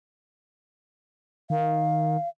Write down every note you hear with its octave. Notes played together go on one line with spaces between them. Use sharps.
D#3 F5